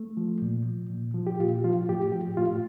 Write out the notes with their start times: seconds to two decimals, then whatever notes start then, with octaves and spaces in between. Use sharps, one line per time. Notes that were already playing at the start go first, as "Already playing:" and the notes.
Already playing: A3
0.17 F3
0.42 A#2
0.66 F3
0.90 A#2
1.15 F3
1.27 G4
1.40 A#2 F4
1.64 F3 F4
1.89 A2 G4
2.12 F3 G4
2.37 A2 F4